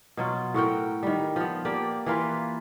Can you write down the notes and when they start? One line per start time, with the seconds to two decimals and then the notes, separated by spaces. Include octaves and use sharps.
0.17 B2 F#3 F4
0.54 A2 F#4 A#4 G5
1.03 D#3 G3
1.36 F3 B3
1.65 A#3 G4 D5
2.06 E3 A#3 F4 B4